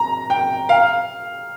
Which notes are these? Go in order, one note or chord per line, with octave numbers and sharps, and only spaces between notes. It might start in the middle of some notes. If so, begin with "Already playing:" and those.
Already playing: A#5
G5
F5